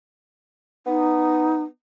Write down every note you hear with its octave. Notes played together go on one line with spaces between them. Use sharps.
B3 D#4